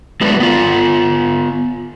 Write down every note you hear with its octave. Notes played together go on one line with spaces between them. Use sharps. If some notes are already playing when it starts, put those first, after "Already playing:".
F#3 G#3 A3 B3 D4 B4
B3 F4